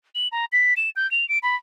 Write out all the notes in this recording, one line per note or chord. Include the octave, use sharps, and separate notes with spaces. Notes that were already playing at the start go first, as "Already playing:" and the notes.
F#7
A#5
B6
E7
G6
F7
D7
B5